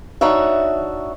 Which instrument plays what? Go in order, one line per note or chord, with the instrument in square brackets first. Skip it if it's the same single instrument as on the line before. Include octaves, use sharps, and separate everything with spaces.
[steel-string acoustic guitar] D4 D#4 F#4 C#5 E5